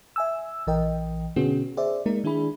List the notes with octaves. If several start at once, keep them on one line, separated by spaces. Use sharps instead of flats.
E5 G#5 E6
A#1 E3 A#4 D#5 G5
B2 D3 B3 C#4 F#4 G#4
G#4 C5 D5 E5
G#3 A#3 D#4 A#4
D#3 D4 E4 G#4 B5